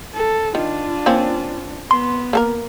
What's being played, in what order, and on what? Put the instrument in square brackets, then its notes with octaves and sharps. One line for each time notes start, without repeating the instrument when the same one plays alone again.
[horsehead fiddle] A4
[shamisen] D#3 [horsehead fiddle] D4 F4
[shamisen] A#3 C4 C#4
[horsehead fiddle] B3 [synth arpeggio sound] C6
[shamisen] A#3 A4 A#4